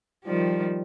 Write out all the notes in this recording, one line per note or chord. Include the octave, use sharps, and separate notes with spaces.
D#3 F3 G3